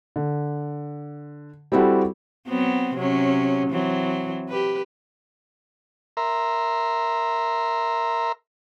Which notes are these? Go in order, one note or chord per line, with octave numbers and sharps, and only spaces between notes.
D3
G3 C4 E4 F#4 G4 A4
F#3 B3 C4
C3 F#3 C#4
E3 F#3 C4
G4 B4
A#4 E5 A#5 C6